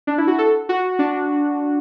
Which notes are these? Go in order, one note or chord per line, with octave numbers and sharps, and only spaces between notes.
D4
E4
F#4
A4
F#4
D4